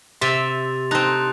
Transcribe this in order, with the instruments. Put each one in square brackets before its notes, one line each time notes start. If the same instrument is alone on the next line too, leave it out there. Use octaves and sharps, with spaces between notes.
[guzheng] C3 E5 [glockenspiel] C6 A6 F7
[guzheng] C4 D#4 [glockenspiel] A5 F#6 F7